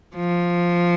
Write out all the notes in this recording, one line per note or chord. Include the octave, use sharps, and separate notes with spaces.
F3